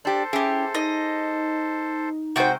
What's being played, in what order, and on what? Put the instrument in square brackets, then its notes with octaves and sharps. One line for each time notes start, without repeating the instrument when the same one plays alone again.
[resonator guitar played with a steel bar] D4 G4 [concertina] A4 C5
[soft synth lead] C#4 [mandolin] E4 G4 [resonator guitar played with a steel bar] G#4
[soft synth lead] D#4 [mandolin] D#5
[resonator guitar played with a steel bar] C3 G#3 C5 [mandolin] F#4 G5